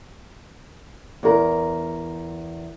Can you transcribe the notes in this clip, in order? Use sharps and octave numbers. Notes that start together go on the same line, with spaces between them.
E2 A#4